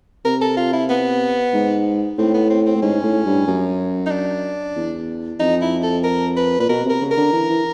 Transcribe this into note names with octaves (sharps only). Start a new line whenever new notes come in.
C3 A#4
A4
F4
E4
B3
G#2
A2 C4
B3
C4
C4
A2
G#2 C#4
A2
G2
F#2
D#4
D4
E2
F2 D#4
E4
A4
A#4
B4
A#2 B4
B2 A#4
C3
A#4
C#3
A#4
D3
E3
E3